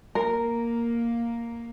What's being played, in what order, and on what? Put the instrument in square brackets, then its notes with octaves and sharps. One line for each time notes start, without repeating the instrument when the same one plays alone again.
[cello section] A#3 [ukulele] A#4